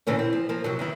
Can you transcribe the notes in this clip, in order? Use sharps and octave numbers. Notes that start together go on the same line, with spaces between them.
A#2 D3 E3 A#3 C#4
C4
F3
F3 A#3
F2 C3 F#3
D#3 E3 E4